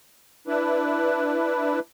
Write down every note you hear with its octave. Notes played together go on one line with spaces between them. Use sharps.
D4 E4 B4